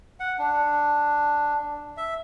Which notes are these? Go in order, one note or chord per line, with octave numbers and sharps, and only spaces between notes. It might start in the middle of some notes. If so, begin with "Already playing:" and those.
F#5
D4
E5